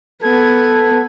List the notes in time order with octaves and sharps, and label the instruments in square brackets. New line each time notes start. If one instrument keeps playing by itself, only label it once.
[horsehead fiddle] B3 [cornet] A4 [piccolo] G#6